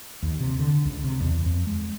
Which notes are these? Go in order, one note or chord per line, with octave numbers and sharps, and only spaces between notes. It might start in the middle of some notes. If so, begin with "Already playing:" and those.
D#2
C3
D3
C#2
C3
E2
F2
G#3